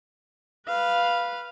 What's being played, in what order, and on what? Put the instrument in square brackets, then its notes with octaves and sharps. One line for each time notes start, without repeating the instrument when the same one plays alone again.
[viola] B4 F5